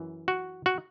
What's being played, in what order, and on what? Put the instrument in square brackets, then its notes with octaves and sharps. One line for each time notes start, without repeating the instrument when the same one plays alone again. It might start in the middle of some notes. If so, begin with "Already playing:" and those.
Already playing: [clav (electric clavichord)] F#2 E3
F#4
F#4